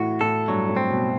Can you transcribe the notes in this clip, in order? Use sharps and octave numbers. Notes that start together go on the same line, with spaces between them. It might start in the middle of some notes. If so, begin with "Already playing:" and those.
Already playing: A2 E3 F#4
A2 A4
G2 F#3
A2
C4
B2